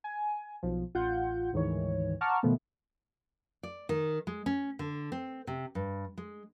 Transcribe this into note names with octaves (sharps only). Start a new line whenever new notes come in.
G#5
B1 F3
A1 F4 F#5 G6
D2 G#2 D#3 E3 C#5
F#5 A5 A#5 C#6 D6 F6
B2 D#3 F3 A3 B3
D5
D#3
G#3
C#4
D3
C4
C3
G2
G#3